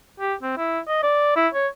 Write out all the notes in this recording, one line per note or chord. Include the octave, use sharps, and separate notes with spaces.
G4
C4
E4
D#5
D5
E4
C#5